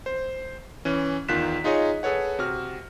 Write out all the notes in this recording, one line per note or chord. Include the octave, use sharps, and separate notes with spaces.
C5
E3 C#4
E2 D#3 F4 F#6 B6 E7
D#4 F4 G#4 C#5 D#5
G#4 A4 B4 C#5 F#5
C3 F#4 F6